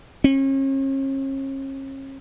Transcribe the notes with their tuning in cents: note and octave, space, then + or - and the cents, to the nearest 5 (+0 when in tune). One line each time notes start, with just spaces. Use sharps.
C#4 -40